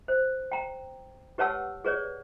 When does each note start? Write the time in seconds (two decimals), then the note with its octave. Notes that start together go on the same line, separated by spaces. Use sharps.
0.08 C5
0.52 G5 A#5
1.38 G4 B4 C#5 F#5 A5 E6
1.84 G#4 B4 C#5 D5